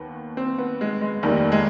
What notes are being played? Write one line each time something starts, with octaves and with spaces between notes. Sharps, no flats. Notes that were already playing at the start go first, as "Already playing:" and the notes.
Already playing: D#2 D#3 B3
C4
B3
G#3
G#3
F1 D#2 D#3 G3
G#3